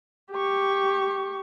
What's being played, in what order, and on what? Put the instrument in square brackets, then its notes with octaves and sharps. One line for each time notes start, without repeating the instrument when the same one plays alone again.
[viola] G4 C#6